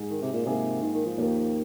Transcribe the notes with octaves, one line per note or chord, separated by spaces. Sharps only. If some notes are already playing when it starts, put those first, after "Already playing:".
Already playing: G#2 G#3 D#4
D#3
C3
A#2
G#2 C3 D#3 A#3 F4 G#4
D#3
D#3
F3
D#2 D#3 A#3